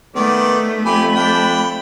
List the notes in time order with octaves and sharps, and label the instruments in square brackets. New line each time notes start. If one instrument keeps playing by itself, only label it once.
[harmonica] D#3 D5 [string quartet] A3 [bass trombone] B3
[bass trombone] F2 [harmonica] G4 G#5 [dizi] B5
[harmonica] D4 G5